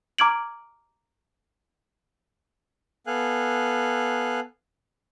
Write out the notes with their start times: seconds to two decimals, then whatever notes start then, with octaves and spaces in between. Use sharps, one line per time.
0.18 A#5 D6 F6 G#6 D7 F#7
3.07 B3 A4 F5 G#5 F#6